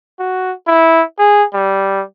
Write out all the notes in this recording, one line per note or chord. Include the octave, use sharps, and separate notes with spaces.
F#4
E4
G#4
G3